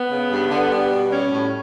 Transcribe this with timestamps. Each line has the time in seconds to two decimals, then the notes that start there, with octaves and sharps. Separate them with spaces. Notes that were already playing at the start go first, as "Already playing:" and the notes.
Already playing: B3
0.11 C#3
0.31 G2
0.51 D3
0.71 G3
0.90 B2
1.10 G3 C#4
1.30 A2